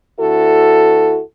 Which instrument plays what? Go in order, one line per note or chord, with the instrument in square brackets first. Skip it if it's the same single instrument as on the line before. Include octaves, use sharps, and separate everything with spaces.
[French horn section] D2 E4 F#4 A4